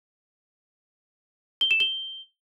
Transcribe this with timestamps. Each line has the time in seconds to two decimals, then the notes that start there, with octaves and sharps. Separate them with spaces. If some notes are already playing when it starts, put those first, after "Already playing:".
1.61 G7
1.71 E7
1.80 G7